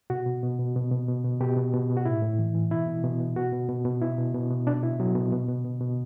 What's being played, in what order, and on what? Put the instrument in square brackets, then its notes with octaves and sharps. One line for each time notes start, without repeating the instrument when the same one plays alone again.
[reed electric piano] B2 F#4
B2
B2
B2
B2
B2
B2
B2
B2 G4
B2
B2
B2
F#4
A2 E4
A2
E3
E3
B2 E4
B2
B2
B2
B2 F#4
B2
B2
B2
B2 E4
B2
B2
B2
B2 D4
B2 E4
B2 F#3
B2
B2
B2
B2
B2